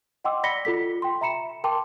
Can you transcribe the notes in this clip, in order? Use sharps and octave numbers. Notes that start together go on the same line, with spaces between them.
D#5 F#5 G5 C6 D6 E6
D5 B5 A#6 B6 C#7 G7
F4 A4 B6
G5 C6
E5 A#5 B5 C#7 E7
A#4 G5 A5 C6 D6